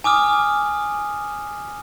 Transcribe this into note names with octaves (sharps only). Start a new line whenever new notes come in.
G#5 D6 D#6 F6